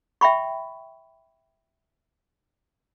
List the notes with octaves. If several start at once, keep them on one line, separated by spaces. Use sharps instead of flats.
E5 G5 B5 C#6